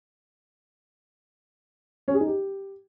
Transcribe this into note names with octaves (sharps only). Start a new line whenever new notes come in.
C#4
G#4
D#4
G4